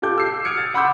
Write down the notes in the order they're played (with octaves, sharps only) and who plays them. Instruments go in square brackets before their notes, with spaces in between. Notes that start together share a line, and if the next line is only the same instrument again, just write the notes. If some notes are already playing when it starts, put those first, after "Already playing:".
[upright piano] F4 G4 A4 D6 G6
E6 C7
D#6 F6 G#6 C#7 D7
A6
F#5 B5 C6 D6 E6 G6